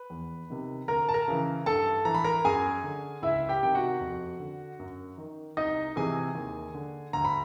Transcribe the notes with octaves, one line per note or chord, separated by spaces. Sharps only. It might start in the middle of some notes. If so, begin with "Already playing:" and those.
Already playing: B4
E2
C3 D#3
D2 A#4 A#5
A5
A#4 A#5
C#3 E3
G2 A4 A5
E3 A#5
B5
A#4 A#5
F#2 G#4 G#5
D3
C#2 E4 E5
G4 G5
C3 D#3 G5
F#4 F#5
F2
D3
F#2
D#3
C2 D#4 D#5
C3 E3 G#4 G#5
D#2
D3
D2 A#5
B5